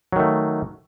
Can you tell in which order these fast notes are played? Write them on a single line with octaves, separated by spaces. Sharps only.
F#3 D#3 A3